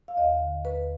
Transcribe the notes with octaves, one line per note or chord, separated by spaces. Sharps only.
F5
D#2 D#5
D3
D#2 B4